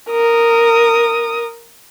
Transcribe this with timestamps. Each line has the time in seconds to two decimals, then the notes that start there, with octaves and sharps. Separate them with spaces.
0.10 A#4 D#6